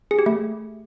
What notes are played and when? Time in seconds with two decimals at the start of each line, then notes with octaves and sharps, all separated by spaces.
0.11 G#4
0.19 G4
0.26 A3